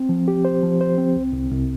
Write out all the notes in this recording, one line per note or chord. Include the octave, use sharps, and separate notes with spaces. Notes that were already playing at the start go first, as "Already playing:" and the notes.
Already playing: C4
F3
G4
C5
F3
C5
C4
C2
C2
C2